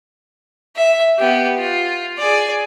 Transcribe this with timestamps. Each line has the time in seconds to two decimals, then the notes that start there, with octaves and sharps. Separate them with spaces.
0.76 E5
1.19 B3 G4
1.59 F4
2.18 G#4 D5